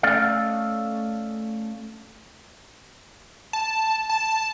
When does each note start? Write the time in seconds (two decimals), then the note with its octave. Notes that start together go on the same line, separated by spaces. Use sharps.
0.03 A3 C#4 A4 D5 D#5 F5
3.53 A5
4.09 A5